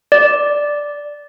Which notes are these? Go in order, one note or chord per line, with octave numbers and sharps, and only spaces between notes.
D5